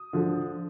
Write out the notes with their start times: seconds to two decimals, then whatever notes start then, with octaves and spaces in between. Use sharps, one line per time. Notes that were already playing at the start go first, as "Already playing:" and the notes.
Already playing: D#6
0.13 D3 F3